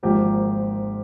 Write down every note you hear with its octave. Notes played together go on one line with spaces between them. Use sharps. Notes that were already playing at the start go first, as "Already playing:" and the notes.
G#1 G#2 F3 A#3 G4